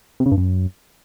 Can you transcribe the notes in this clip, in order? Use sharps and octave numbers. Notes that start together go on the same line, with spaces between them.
C3
C#3
G2
F#2